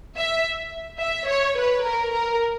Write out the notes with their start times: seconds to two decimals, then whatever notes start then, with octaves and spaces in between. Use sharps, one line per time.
0.17 E5
1.00 E5
1.28 C#5
1.57 B4
1.84 A#4
2.12 A#4